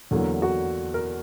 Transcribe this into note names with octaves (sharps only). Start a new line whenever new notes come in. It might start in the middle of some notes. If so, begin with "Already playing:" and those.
E2 D3 F#3 A#3
F#4
A#4